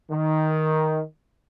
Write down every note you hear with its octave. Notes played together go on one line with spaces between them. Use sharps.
D#3